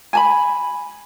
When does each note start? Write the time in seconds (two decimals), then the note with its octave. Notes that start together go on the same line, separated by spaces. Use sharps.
0.13 G#5 A5 B5